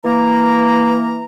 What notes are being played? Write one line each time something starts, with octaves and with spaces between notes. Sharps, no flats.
E3 A#3 A#5